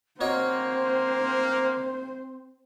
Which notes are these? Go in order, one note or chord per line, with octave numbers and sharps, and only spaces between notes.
A#3 C4 F#4 C5 C#5 D#5